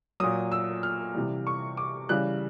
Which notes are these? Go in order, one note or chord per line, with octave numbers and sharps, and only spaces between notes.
A#2 F#3 D#6
E6
F6
C3 E3 G3
C#6
D6
C#3 E3 G3 F#6